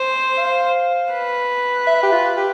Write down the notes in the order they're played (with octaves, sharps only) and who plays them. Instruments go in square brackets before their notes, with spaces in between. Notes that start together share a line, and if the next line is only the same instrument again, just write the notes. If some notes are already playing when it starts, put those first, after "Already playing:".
Already playing: [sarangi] C5
[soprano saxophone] F5
[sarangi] B4
[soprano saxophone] E5
G4
F4
G4